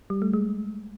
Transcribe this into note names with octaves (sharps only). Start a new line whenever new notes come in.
G3
A3
G#3